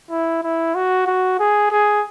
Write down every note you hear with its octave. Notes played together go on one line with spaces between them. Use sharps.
E4
E4
F#4
F#4
G#4
G#4